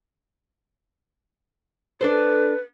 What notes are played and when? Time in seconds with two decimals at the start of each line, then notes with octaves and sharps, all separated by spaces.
2.01 D4 A4 B4 C5